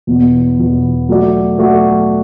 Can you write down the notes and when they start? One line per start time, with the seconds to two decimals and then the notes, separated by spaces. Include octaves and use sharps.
0.07 E2 B2 B3
0.59 E2 B2 B3
1.09 F#3 A3 F#4 D5
1.58 F#3 A3 F#4 D5